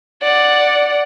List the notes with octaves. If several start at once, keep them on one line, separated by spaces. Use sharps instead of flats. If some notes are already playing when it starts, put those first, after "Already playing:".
D5 F#5